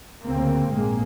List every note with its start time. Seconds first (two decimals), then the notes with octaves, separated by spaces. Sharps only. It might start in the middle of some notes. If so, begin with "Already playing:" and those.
0.23 D2 C#3 A#3 C4
0.70 A#1 G#2 G#3 A#3